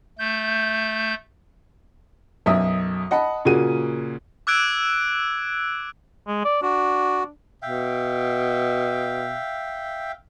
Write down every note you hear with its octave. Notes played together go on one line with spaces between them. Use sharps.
A3 G6
B1 F#2 E5 D#6
D#5 F#5 A5 B5
A#2 C#3 A#3 F#4 D#7
D6 E6 F#6 G#6 D7
G#3
D5
D4 F#4
B2 E5 F5 G5